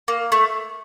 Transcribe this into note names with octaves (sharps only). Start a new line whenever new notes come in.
A#3
A3